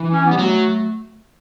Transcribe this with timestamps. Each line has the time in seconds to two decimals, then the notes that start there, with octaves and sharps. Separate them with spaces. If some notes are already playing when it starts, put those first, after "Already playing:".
Already playing: E3
0.12 C#4
0.25 B3
0.31 G3
0.39 F#3 A3